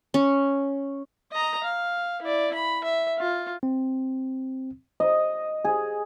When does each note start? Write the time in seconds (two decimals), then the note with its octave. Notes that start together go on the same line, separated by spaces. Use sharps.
0.14 C#4
1.32 D#5 A#5
1.64 F5
2.22 E4 D5
2.54 B5
2.84 E5
3.19 F4
3.63 C4
5.00 D#5
5.65 G#4